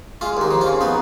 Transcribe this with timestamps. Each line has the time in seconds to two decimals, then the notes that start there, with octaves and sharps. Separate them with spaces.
0.21 G#3 F4
0.37 D#2 D#4
0.51 F3
0.61 F4
0.67 C#3
0.81 B3 D#4